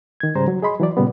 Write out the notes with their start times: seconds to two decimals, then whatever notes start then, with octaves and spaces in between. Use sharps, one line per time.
0.20 D#3 G#6
0.35 G#2 C#3 G3 C5 A#5
0.48 F#3
0.62 G#4 D#5 B5 C6
0.80 E3 F#3 D5
0.97 A#2 C#3 G3 B3